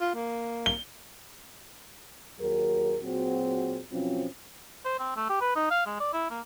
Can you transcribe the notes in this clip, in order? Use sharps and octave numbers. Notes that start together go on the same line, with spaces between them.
F4
A#3
G7
D#2 F#3 G#4 A#4
A#2 F#3 C4 F#4 G#4
B2 F3 F#3 C4 C#4
C5
C4
A3
G4
B4
D#4
F5
G#3
D5
E4
A#3